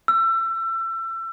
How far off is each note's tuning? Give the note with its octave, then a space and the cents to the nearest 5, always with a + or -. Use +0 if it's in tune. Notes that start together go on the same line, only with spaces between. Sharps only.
E6 +30